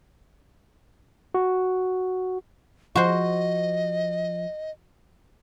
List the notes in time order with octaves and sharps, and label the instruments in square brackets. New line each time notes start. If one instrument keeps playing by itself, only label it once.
[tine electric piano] F#4
[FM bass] F3 [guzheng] F#4 C5 [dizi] D#5